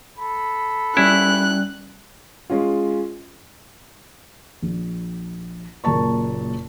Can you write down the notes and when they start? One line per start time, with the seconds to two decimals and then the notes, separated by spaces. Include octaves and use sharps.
0.19 A4 B5
0.97 G3 C#4 E4 F#6
2.50 G#3 C#4 F4
4.62 A#1
5.84 F#1 A#2 A#4 A5 C#6